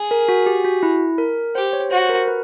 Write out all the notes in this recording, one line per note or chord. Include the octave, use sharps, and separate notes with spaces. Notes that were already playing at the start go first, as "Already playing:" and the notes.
Already playing: G#4
A#4
F#4
G4
F#4
E4
A#4
G4 C5
C#5
F#4 C5
A#4
B4